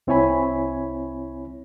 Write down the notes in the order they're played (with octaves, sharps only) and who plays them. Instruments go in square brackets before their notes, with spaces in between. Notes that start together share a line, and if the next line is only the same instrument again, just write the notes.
[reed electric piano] C2 C4 E4 C#5 G#5 B5